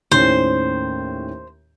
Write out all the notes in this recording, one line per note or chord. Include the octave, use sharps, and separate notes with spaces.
D#2 A2 C#4 C5